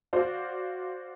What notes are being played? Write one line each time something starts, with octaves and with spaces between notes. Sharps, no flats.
F#4 C5 D5 F5